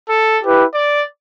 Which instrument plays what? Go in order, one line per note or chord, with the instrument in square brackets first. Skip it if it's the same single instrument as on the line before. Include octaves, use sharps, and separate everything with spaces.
[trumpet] A4
[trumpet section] E4 G4 B4
[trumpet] D5